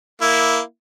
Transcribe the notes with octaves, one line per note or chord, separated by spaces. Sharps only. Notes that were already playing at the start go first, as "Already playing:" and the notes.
A#3 E4